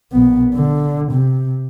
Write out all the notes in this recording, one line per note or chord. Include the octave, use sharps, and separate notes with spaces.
A#1 B3
D3
C3